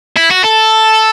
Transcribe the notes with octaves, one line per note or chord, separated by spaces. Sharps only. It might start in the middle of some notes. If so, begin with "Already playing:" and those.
E4
F#4
A4